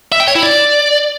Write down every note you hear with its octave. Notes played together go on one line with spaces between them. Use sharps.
E5
G5
C#5
E4
D5